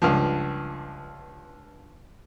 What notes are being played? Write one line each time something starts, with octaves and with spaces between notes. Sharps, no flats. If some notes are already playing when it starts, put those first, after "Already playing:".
C#2 G2 F3